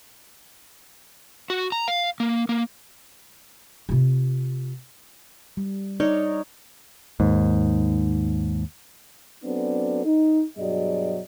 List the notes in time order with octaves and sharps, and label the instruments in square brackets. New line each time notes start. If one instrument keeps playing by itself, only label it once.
[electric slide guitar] F#4
A#5
F5
A#3
A#3
[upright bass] C3 F4
[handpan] G3
[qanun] D#4 A#4 C#5 [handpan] D5
[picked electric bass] D#2 G#2
[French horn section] F#3 B3 C4 D4 A4 D5
D#4
G2 B2 F#3 G#4 D5 D#5